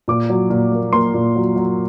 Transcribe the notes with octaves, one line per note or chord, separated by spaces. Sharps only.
A#2 D6
F#3
A#2
A#3
A#3 C6
A#2
F#3
F#3